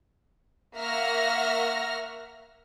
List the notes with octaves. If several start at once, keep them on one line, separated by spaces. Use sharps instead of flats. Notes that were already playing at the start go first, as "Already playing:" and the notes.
A#3 E5 F#5 C#6 F6 A#6